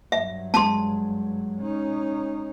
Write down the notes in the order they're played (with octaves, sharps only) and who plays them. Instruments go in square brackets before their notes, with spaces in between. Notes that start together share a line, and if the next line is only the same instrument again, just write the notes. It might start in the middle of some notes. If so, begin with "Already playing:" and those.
[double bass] G2 F#3 [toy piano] E5
[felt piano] G#3 [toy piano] A5 C6
[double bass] C#4 D#4